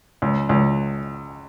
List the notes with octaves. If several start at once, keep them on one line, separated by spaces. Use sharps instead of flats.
C#2
C#2